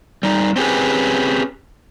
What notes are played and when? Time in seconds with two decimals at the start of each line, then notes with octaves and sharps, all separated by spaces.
0.23 G3 D#4
0.56 C4 C#4 G4 G#4 B4